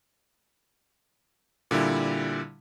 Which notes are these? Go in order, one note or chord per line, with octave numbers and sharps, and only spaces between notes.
A#2 D3 G3 E4